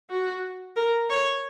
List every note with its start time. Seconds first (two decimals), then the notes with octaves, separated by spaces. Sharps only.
0.10 F#4
0.76 A#4
1.10 C#5